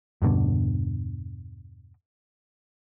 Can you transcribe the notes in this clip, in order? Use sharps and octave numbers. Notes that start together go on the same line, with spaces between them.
E2 G2 B2 D3